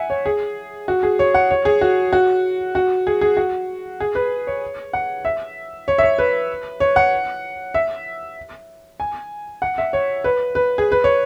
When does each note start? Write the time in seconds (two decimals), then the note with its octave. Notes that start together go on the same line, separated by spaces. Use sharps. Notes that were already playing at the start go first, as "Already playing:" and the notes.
Already playing: E5 F#5 G#5
0.10 C#5
0.26 G#4
0.88 F#4
1.03 G#4
1.19 C#5
1.34 F#5
1.51 C#5
1.65 G#4
1.81 F#4
2.13 F#4
2.75 F#4
3.07 G#4
3.21 G#4
3.37 F#4
4.00 G#4
4.15 B4
4.47 C#5
4.93 F#5
5.25 E5
5.88 C#5
5.98 E5
6.03 C#5
6.18 B4
6.80 C#5
6.96 F#5
7.74 E5
9.00 G#5
9.62 F#5
9.78 E5
9.93 C#5
10.24 B4
10.55 B4
10.78 G#4
10.92 B4
11.04 C#5